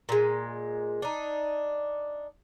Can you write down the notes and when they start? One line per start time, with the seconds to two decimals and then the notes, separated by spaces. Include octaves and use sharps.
0.09 A#2 G#3
1.02 D4 D#4